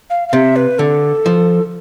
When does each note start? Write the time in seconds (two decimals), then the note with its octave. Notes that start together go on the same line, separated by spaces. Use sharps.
0.10 F5
0.29 F5
0.33 C3 E5
0.56 B4
0.79 D3 A4
1.26 F3